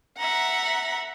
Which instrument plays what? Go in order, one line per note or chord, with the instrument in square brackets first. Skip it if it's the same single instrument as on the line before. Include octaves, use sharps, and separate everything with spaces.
[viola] E5 A#5 [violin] F#5